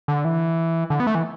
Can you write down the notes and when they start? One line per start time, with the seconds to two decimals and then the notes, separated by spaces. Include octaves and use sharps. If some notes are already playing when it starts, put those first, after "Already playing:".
0.08 D3
0.25 E3
0.90 D3
1.00 B3
1.07 A3
1.15 E3